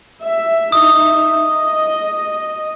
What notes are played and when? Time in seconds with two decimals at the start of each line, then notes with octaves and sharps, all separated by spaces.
0.24 E5
0.72 D#4 E5 D#6
1.45 D#5